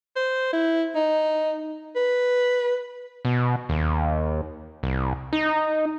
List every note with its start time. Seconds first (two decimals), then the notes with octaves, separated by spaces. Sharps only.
0.16 C5
0.53 E4
0.96 D#4
1.96 B4
3.25 B2
3.69 D#2
4.83 C2
5.33 D#4